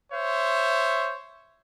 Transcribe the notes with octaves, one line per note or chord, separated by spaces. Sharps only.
C5 C#5 E5